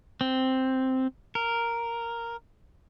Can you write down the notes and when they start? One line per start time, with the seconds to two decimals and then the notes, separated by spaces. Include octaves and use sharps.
0.21 C4
1.35 A#4